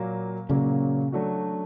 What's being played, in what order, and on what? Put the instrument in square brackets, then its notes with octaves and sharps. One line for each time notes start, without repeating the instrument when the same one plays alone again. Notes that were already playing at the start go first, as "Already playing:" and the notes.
Already playing: [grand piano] A#2 F#3 A#3
[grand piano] A#2 F#3 A#3 [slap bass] C#3
[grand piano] F#3 A3 D4 F#4